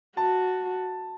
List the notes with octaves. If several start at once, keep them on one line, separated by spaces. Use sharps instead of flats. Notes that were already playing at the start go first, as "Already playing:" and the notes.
F#4 A5